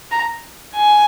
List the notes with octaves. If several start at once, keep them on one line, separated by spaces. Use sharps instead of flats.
A#5
G#5